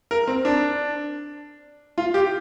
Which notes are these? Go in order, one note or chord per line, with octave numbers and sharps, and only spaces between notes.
A#4
C4
D4
F4
G4